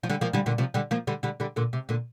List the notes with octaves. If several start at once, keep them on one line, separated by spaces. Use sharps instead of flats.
F3
D3 G3
F3 A#3
D3 G3
A#2 D3
C3 F3
D3 G3
F3 A#3
D3 G3
D3 G3
D3 G3
A#2 D3
C3
A#2 D3